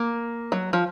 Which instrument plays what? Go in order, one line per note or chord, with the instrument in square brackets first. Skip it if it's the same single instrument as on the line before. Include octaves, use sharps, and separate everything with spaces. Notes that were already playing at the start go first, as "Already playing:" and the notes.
Already playing: [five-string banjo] A#3
F#3
F3